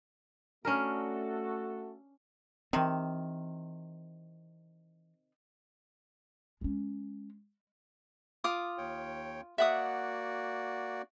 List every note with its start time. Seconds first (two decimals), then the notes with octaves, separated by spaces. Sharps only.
0.65 A3 C#4 D4 F#4 A4 A#4
2.73 C3 D#3 E3 C4
6.61 G#3 C#4
8.44 F4 D6 D#6
8.78 D#2 C#5 G5
9.58 A#3 F#4 D5 E5 F#5 D#6